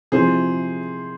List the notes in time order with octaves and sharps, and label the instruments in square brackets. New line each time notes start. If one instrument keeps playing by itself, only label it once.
[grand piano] C3 F3 G#3 E4 [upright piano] G#4 C5